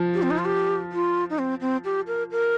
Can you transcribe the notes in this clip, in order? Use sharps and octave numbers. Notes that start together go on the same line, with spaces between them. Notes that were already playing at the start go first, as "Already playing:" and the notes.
Already playing: F3
G4
C4
D#4
F4
G4
F4
D#4
C4
C4
G4
A#4
A#4